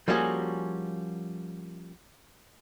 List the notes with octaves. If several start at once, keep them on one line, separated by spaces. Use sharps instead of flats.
F3 G3 A#3 C#4 F#4 G#4